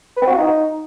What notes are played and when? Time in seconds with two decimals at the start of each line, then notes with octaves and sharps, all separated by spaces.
0.17 B4
0.22 C4
0.27 F#4
0.33 F4
0.38 D#4